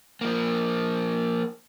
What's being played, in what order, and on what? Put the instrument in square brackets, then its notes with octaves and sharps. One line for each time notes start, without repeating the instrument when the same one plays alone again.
[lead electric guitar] F3 A#3